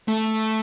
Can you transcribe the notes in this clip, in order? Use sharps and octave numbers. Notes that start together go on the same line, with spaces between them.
A3